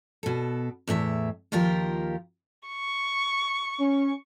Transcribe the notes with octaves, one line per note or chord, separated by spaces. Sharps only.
B2 A4
E2 A2 G#4 E5
D#2 F3 F4 G4 A#4
C#6
C#4